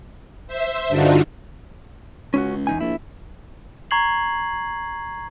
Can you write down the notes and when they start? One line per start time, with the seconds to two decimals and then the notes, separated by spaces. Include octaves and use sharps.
0.47 C5 E5
0.89 G2 D3 D4 D#4 F4 F#4
2.34 C#2 C#4 E4 F#4
2.67 E2 D#4 G#5
2.81 A#1 E4
3.91 A#5 C#6 G#6 C7 F#7